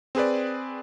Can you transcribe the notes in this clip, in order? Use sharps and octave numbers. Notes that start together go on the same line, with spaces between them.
C4 G#4 B4 D5